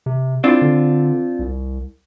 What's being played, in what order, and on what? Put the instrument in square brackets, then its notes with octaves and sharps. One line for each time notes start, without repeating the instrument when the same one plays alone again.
[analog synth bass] C3
[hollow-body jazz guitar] C4 D4 F4 [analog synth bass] E4
[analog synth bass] D3
C2